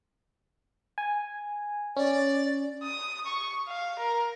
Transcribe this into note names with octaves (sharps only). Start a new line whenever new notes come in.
G#5
C#4 D5
D#6
C#6
F5
A#4